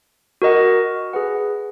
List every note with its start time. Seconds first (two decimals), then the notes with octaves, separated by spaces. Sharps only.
0.42 F#4 A#4 D#5 F#5
1.13 G#4 B4 F#5